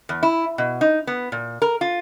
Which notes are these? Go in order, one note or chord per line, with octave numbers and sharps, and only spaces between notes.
E2
E4
B2
D#4
B3
A#2
A#4
F4